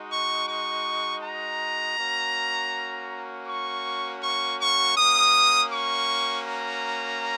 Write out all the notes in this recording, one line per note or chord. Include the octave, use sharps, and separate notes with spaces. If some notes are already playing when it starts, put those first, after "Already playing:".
Already playing: G#3 D#4 F#4
C#6
C#6
A#5
A#3 C#4 F#4
C#6
C#6
C#6
A#3 C#4 F#4 D#6
C#6
A#5